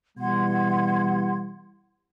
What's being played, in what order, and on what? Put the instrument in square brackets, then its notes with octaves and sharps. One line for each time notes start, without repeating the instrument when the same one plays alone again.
[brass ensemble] B2 E3 G3 [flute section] F#5 C6 G#6